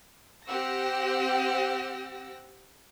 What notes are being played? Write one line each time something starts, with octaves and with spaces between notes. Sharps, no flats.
C4 G4 F#5 E6 A#6